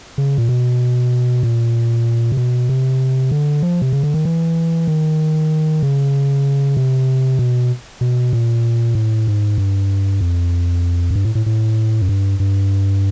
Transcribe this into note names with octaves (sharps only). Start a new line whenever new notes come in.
C#3
A#2
B2
A#2
C3
B2
C3
D3
F3
C3
C#3
D3
D#3
E3
D#3
C#3
C3
B2
B2
A#2
A2
G#2
G2
F2
F#2
G2
A2
A2
A2
F#2
G2
G2